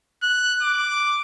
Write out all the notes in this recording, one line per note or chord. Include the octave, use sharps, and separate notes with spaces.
F#6
D6